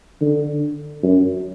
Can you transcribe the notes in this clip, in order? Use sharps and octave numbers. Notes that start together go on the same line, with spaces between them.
D3
F#2